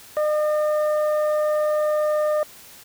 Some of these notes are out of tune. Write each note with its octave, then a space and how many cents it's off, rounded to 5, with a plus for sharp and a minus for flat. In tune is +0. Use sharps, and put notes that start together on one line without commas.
D#5 -45